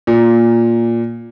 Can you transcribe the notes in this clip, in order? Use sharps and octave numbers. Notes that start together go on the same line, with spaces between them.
A#2